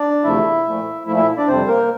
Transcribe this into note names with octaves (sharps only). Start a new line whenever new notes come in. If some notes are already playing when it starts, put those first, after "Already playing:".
Already playing: D4 D5
E2 C3 F3 A3 E4 E5
A#2 F3 A3
A#2 F3 A3 E4 E5
E4 E5
D4 D5
F2 C3 G3 C4 C5
A#3 A#4